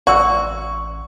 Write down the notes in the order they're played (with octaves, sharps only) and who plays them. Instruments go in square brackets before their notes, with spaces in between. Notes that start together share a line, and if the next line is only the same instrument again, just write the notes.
[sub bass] A1 [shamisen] F#4 [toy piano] D5 C6 E6 [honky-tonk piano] C#6